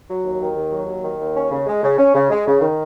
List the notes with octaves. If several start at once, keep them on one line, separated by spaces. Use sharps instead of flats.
F#3
D#2
D#3
D#2
F#3
D#2
D#3
D#2
C#4
C#3
G#3
C#3
C#4
C#3
G#3
C#3
D#3